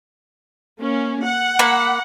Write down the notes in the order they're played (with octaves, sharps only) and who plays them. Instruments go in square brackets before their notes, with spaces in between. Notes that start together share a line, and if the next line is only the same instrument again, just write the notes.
[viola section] A#3 C#4
F#5
[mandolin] A#3 B5